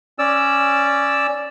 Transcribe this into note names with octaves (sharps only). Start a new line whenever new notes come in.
C#4 D5 E6